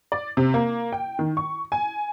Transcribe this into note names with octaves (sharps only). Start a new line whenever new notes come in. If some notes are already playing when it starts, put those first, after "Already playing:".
D5
C3
A#3
G5
D#3
C#6
G#5